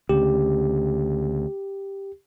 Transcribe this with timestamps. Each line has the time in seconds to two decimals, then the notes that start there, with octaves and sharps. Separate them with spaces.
0.09 D2 C#3 G4